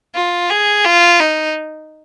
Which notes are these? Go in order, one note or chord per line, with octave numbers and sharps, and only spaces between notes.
F4
G#4
F4
D#4